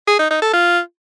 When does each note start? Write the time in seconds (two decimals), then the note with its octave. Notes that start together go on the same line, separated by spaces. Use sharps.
0.07 G#4
0.19 D#4
0.31 D#4
0.42 A4
0.54 F4